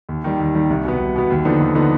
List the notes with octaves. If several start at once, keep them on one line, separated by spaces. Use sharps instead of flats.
D#2
D#3 G3
D#2
D#3 G3
C2
B2 B3
C2
B2 B3
D#2
D3 F3 B3 D#4
D#2
D3 F3 B3 D#4